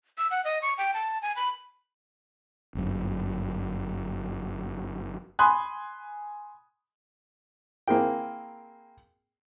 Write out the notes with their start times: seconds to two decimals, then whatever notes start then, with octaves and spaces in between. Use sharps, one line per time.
0.18 E6
0.31 F#5
0.45 D#5
0.62 C#6
0.78 G5
0.94 A5
1.22 G#5
1.36 B5
2.75 G1 F#2
5.39 G#5 B5 C6 D#6 F#6
7.88 A#3 C4 E4 G#4 A#4 G5